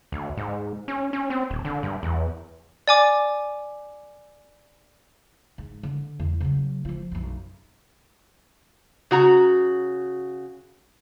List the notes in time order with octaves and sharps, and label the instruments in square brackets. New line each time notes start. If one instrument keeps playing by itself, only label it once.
[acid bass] D2
G#2
C#4
C#4
C4
D#1
D3
G2
E2
[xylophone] D5 G#5 D6
[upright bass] G#2
D3
E2
C#3 F#3
F3 F4
B1 F#2
[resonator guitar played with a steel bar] C#3 F#4 A#5